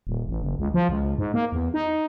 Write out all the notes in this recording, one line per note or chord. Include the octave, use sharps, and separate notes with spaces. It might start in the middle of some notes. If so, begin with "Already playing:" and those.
D#1
A1
F#1
C#2
F3
C#2
G#2
A#3
E2
D#4